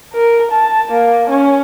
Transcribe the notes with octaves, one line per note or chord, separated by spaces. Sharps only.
A#4
A5
A#3
C#4